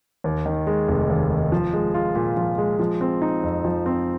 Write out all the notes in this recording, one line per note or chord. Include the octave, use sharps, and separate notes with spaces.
D#2
D#3
G#3
F1
D#2
D#3
F3
G#3
F4
A#2
F3
G#3
F3
C4
D#4
F2
F3
C4